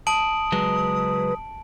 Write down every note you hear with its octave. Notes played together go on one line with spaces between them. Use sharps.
A5 D#6 D7 F#7
C#2 F#3 G#3 B4